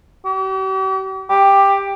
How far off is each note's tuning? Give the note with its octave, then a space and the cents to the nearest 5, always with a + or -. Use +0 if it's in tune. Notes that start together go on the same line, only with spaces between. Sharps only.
G4 -45
G4 +10